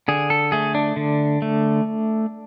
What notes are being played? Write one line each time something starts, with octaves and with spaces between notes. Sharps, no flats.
D3 G#4
A4
A3 G#4
D4
D3
A3